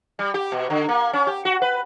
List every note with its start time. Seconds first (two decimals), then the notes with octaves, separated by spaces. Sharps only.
0.19 G3
0.34 G4
0.52 B2
0.70 D3
0.89 A#3
1.13 C#4
1.27 G4
1.45 F#4
1.62 B4